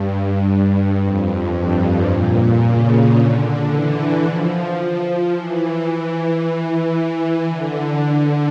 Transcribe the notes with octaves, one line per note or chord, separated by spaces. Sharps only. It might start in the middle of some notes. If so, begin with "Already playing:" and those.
Already playing: G2
F2
G2
A#2
C#3
D3
E3
F3
F3
E3
E3
D3